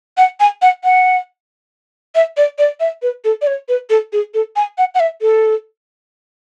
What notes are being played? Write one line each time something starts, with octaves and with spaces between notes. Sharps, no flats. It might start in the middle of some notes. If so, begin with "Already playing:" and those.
F#5
G#5
F#5
F#5
E5
D5
D5
E5
B4
A4
D5
C#5
B4
A4
G#4
A4
G#5
F#5
F#5
E5
A4